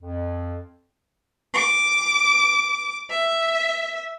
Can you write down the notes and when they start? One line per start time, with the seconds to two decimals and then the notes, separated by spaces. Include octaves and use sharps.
0.01 F2
1.53 D6
3.10 E5